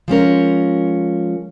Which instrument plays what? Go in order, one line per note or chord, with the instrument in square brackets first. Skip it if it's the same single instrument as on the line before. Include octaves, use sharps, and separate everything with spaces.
[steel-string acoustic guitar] F3 G#3 C#4 A#4